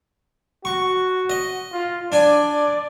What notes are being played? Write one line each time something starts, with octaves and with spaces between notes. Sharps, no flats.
F#4 C#6
D#5
F4
D4 D5 G#5